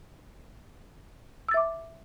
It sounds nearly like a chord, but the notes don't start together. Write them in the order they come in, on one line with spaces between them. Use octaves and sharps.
E6 A6 E5 D6